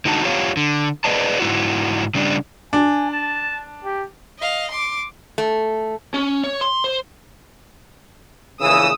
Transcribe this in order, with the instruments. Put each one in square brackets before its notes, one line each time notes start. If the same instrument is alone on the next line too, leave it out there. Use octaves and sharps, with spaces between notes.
[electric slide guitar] D3 D#4 F#4 A5
F4 G4 C#5 F5
D3
G#4 B4 D5 D#5 A5
G#2 E4 F#4
C#3 G3 D4
[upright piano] D4 [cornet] G#5
[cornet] A5
G4
[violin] D#5 F5
C6 D6
[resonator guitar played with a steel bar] A3
[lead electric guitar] C#4
C#5
C6
C5
[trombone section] A#1 C#3 E3 [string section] D#6 E6